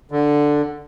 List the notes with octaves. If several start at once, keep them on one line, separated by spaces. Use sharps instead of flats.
D3